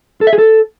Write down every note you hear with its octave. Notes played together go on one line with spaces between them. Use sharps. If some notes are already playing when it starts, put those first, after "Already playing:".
A4
E5
G#4
A4